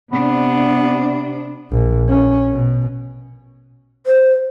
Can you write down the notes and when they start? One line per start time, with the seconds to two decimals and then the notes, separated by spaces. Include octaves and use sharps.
0.12 C3 B3 D4
1.72 A#1
2.09 C#4
2.52 B2
4.07 C5